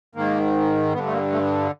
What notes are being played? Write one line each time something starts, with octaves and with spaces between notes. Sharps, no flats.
G#2 D#3 A#3
G2 D3 B3
A3
A#3
A3